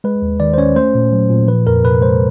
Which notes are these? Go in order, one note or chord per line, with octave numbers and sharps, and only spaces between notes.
G#3 B4
D#2
D#3 D5
C5
C#4 C#5
A3 C5
A#2
F#3
A#2
F3 B4
F2 A#4
C3 B4
G#3 C5